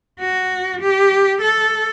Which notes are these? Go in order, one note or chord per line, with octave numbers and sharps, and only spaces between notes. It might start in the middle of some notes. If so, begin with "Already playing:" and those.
F#4
G4
A4